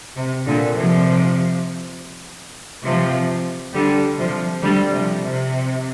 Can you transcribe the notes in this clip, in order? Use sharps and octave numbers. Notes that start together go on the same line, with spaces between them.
C3
A#2 D3
C3 F3
C3 F3
D3 G3
C3 F3
D3 G3
C3 F3
C3